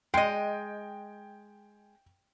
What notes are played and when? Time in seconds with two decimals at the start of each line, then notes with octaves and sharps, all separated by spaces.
0.14 G#3 D#5 G5